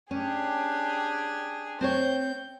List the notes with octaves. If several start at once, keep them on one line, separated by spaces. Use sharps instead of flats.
C#4 D4 G4 G#4
C4 C5 C#5 G6